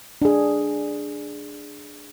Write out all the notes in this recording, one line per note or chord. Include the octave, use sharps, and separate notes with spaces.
D4 G#4